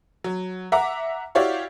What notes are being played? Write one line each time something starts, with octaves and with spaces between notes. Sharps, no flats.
F#3
E5 F#5 A#5 D6
E4 F#4 G4 C#5 D5 F5